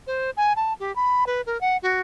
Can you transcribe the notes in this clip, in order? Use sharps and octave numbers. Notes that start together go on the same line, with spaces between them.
C5
G#5
A5
G4
B5
B4
A#4
F#5
F#4